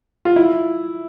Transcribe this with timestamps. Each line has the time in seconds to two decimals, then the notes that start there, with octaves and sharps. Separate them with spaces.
0.25 F4
0.36 E4